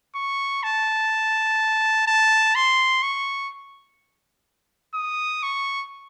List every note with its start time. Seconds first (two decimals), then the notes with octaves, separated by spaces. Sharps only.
0.15 C#6
0.63 A5
2.07 A5
2.55 C6
3.03 C#6
4.95 D#6
5.43 C#6